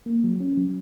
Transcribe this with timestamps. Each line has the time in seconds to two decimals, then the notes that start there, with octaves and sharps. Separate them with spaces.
0.06 A#3
0.24 F#3
0.40 C#4
0.57 F#3